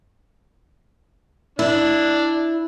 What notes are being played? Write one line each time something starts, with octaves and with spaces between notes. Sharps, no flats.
D4 E4